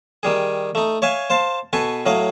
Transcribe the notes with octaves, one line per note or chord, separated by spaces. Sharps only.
D#3 G3 G#4
A3 D#4
C#5 E5 F5 G#5
C5 F5 A5
B2 A4 B4 G#5 C#6
A2 F#3 D#5 F5